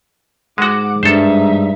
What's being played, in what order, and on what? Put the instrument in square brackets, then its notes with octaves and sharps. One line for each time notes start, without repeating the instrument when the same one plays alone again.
[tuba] G#2 [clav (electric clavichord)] G#3 F#4 [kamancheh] F#5 D6
[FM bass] G2 [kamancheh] D#4 E5 [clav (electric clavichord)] A4 C5